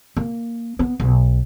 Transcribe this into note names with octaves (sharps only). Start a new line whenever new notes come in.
A#3
B3
B1